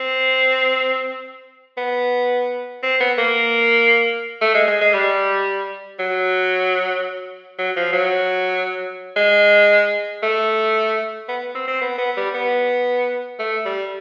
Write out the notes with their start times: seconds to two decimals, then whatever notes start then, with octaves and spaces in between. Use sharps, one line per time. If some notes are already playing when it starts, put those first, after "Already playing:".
Already playing: C4
1.77 B3
2.83 C4
3.00 B3
3.18 A#3
4.41 A3
4.54 G#3
4.68 G#3
4.81 G#3
4.93 G3
5.99 F#3
7.58 F#3
7.76 F3
7.93 F#3
9.16 G#3
10.23 A3
11.28 B3
11.55 C4
11.68 C4
11.81 B3
11.98 B3
12.17 G3
12.34 B3
13.39 A3
13.65 G3